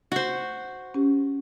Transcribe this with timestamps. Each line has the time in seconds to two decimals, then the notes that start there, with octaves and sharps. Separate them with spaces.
0.12 F#4 C5
0.94 C#4 G4